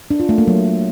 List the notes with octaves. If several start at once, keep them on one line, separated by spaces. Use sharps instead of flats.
D4
F4
A3
A#3
F#3